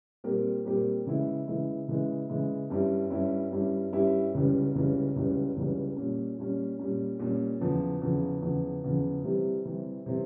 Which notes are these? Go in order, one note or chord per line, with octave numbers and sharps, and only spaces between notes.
A#2 G3 C4 G4 A#4
A#2 G3 C4 G4 A#4
C#3 E3 G#3 E4
C#3 E3 G#3 E4
C#3 E3 G#3 E4
C#3 E3 G#3 E4
G2 G3 C#4 E4 G4
G2 G3 C#4 E4 G4
G2 G3 C#4 E4 G4
G2 G3 C#4 E4 G4
C#2 C#3 E3 G3 C#4
C#2 C#3 E3 G3 C#4
C#2 C#3 E3 G3 C#4
C#2 C#3 E3 G3 C#4
A#2 G3 C#4
A#2 G3 C#4
A#2 G3 C#4
A#2 G3 C#4
E2 C#3 F3
E2 C#3 F3
E2 C#3 F3
E2 C#3 F3
C3 E3 G3 C4
C3 E3 G3 C4
C3 E3 G3 C4